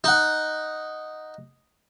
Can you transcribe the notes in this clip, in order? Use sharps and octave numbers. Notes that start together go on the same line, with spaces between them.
D#4 F#5